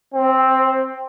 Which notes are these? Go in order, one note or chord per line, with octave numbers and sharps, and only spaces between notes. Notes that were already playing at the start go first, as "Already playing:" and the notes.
C4